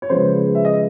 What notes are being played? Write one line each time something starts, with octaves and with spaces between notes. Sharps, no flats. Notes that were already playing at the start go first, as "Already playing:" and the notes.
C#5
C#3 F3 G#3 B3 C5
E5
D#5